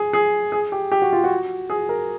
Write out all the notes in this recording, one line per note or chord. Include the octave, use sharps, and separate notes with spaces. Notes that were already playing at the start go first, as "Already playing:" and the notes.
Already playing: G#4
G#4
G#4
G4
G4
F#4
F4
F#4
G#4
A#4